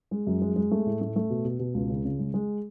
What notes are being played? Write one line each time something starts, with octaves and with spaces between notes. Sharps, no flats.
G#3
F#2
G#3
G#3
A3
A2
A3
A3
B2
B2
B2
C#2
C#3
C#3
G#3
G#3